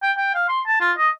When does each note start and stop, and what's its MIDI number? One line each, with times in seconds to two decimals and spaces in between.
0.02 0.12 79
0.17 0.33 79
0.34 0.48 77
0.49 0.61 84
0.67 0.80 81
0.81 0.92 65
0.98 1.09 75